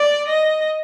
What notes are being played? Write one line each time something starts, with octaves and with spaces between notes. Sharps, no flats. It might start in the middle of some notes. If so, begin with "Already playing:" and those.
Already playing: D5
D#5